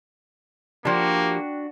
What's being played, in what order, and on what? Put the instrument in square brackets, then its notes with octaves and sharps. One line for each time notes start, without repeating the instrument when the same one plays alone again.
[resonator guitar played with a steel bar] F3 G4 [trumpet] A#3 [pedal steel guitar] D4 F#4 [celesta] D5 G5